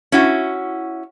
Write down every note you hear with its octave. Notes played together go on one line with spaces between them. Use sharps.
C#4 E4 F#4